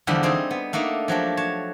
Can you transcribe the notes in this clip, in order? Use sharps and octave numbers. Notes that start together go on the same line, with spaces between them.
E2 D3 F3 G3 G4 B5
G3 C4 D#4 G#4
B3
A3 A#3 D4 D#4
F3 F#3 D4 G4
C#5 A5